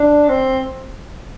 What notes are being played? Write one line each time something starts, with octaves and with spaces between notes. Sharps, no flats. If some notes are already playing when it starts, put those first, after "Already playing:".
Already playing: D4
C4